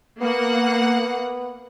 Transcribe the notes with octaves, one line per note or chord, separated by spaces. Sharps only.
A#3 B3 F#5